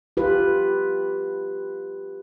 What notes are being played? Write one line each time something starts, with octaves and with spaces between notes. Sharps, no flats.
F4 G4 B4